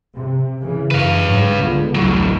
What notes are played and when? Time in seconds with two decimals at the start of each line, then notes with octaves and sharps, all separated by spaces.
0.16 C3
0.60 C#3 E3
0.91 F#2 B4 F5
1.24 G#2 C#3 F#3
1.57 C#2 D3 B3
1.95 A1 D2 A2 F#3